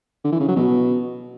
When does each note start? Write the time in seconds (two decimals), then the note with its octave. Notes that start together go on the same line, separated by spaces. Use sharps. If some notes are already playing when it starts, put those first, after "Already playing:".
0.24 D3
0.32 E3
0.40 C#3
0.48 F#3
0.56 B2